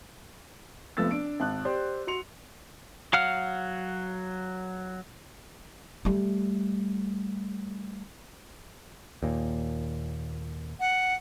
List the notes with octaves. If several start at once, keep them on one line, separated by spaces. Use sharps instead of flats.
F1 F3 A3 B3 E6 A6
D4 D7
G#1 A5 F#6
G4 C5 D5
F#4 C6 C#7 F7
F#3 F5 F#5 F6
G3 A3
D#2 A#2
F#5